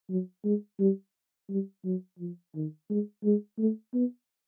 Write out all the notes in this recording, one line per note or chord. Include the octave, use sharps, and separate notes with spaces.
F#3
G#3
G3
G3
F#3
F3
D#3
G#3
G#3
A3
B3